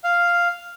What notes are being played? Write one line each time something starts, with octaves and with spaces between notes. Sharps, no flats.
F5